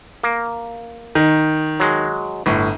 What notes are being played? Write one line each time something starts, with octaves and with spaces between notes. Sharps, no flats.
A#3
D#3
F#3 G#3
G1 A2